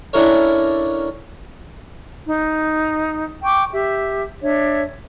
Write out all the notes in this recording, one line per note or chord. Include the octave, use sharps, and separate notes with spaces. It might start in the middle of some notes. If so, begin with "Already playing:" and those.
C#4 D4 E4 A4 A#4 C#5
D#4
G5 C#6 D6
G4 E5
D4 C#5 E5